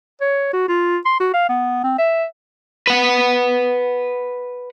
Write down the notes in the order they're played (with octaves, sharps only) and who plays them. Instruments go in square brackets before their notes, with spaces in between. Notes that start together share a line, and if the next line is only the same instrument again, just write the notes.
[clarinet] C#5
F#4
F4
C6
F#4
F5
B3
C4
E5
[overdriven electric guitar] B4 F#5